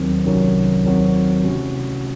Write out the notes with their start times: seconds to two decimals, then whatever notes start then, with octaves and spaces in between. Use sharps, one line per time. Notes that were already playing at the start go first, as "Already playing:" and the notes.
Already playing: D#2 D#3 F#3 C4
0.24 C2 C3 D#3 F#3 C#4
0.85 D#2 D#3 F#3 C4 F#4
1.44 C3 E3 A3 C#4 F#4